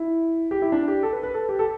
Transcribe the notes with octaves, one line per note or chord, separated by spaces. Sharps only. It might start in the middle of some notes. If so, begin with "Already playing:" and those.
Already playing: E4
G4
E4
D4
G4
A4
B4
B4
A4
G4
A4